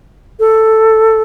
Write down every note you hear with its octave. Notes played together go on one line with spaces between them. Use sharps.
A4